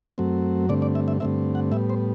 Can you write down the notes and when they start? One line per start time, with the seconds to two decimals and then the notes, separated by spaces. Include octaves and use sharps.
0.18 F#2 F#3 A3 C4
0.69 G2 D3 A3 C4 D5
0.82 D5
0.95 E5
1.08 E5
1.20 G2 D3 A3 C4 E5
1.55 F#5
1.72 A2 G3 B3 E5
1.90 C5